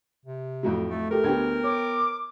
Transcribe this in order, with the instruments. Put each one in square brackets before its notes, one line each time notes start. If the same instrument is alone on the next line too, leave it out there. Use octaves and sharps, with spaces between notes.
[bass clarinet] C3
[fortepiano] F2 A2 F#3
[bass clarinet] A3
[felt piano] A3 G4 A4 [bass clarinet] A#4
[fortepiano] D2 G4 [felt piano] B3 G5 G#6
[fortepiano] C#5 [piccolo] D6